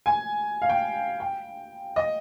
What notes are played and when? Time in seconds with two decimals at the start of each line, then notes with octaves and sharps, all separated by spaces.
0.06 G#5
0.62 F5
0.69 G5
1.20 G5
1.96 D#5